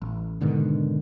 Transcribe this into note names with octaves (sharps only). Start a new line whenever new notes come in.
A1
G#2 B2 D3 D#3